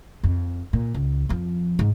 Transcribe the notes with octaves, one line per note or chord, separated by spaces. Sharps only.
F2
A#2
C#2
F2 F3
G#2